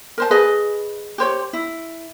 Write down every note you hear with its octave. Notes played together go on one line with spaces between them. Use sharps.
A#4 C5 A5
G#4 B4 D#5
G4 C5 C#5
E4